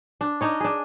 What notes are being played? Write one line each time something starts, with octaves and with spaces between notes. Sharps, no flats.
D4
D4 D#4 C#5
D4 G#4